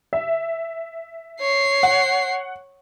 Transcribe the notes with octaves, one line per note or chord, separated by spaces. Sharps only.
E5
C#5 C7
F#5